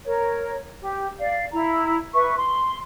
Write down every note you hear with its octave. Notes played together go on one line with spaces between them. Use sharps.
A#4 C#5
G4
D5 F5
E4 A#5
B4 E5 C#6
C6